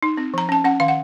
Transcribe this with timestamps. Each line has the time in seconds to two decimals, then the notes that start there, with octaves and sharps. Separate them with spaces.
0.03 D#4
0.18 C4
0.34 F3 A#5
0.49 C#4 A5
0.64 C#4 F#5
0.80 D#3 F5
0.88 F#5